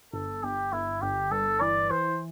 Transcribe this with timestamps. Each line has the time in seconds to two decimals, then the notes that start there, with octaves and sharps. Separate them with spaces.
0.13 G1 A4
0.43 G1 G4
0.73 G1 E4
1.02 G1 G4
1.31 G2 A4
1.61 E3 D5
1.90 E3 C5